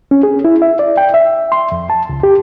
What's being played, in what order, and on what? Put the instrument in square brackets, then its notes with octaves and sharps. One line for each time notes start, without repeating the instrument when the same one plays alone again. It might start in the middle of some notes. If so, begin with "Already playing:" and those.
[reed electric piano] C#4
G#4
E4
E5
D5
G5
E5
C6
F2
A5
C#2
G4